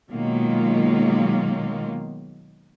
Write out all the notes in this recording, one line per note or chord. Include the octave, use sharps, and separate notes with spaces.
B2 D#3 F#3 G#3 A#3 F4